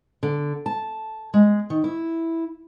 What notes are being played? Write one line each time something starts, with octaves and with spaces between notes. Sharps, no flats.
D3
A5
G#3
D#3
E4